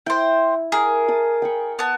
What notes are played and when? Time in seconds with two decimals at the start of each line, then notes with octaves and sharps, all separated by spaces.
0.06 E4 C5 G5
0.72 G#4 A#4
1.08 A5 D#6
1.42 G5 B5 C#6
1.79 B3 A5